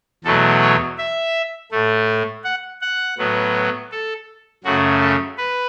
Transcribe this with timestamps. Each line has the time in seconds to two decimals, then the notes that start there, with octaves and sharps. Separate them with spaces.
0.24 E2 B2 F#3 A3 A4
0.61 C#5
0.98 E5
1.71 A2 A3
2.44 F#5
2.81 F#5
3.18 A2 F#3 B3
3.92 A4
4.64 F#2 C#3 A3 F#4
5.01 A4
5.38 B4